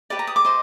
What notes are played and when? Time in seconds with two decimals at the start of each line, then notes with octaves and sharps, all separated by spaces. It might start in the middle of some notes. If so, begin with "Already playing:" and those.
0.10 G4 B4 D5
0.19 A#5
0.27 D#6
0.36 D6
0.45 C5 D#5